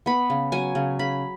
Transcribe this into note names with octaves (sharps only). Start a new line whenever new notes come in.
B3 B5
C#3
F#3 G#5
C#3
C#3 B5